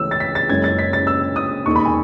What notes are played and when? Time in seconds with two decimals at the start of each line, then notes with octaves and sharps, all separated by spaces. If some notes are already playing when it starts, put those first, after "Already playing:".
Already playing: C#2 C#3 E3 A3 C#4 E6
0.11 A6
0.20 B6
0.35 A6
0.49 F#1 F#2 C#3 G#3 C#4 G#6
0.64 A6
0.79 B6
0.93 A6
1.07 E6
1.36 D#6
1.66 E1 D#2 D#3 C#6
1.75 B5
1.85 G#5